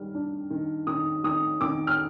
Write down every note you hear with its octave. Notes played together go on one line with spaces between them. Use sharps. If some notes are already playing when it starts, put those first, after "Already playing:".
Already playing: D#3 G3 F6
D4
D#3
D#3 D#6
D#3 D#6
D#3 D6
F6